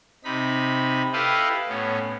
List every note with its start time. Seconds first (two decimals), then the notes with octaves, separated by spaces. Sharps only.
0.24 C3 D#4 B5
1.13 E4 G4 A4 B4 D#5 F5
1.69 A2 B3 C#4